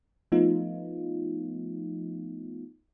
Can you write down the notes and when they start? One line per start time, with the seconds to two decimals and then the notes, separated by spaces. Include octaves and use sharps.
0.32 F3 A3 B3 D#4 F4